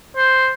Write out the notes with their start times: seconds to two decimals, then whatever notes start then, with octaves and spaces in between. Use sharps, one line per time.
0.16 C5